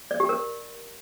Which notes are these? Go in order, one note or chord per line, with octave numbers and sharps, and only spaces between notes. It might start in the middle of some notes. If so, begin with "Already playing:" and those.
D5
G4
A#4